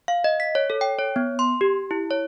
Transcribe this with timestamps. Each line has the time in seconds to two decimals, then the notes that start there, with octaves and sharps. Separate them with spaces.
0.08 F5
0.24 D#5
0.40 B6
0.55 C#5
0.70 A4
0.81 G5
0.99 C#5
1.16 B3
1.39 C6
1.61 G4
1.91 E4
2.11 C#5